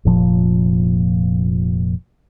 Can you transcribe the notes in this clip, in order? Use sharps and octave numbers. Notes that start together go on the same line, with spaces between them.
F1 A#2 F3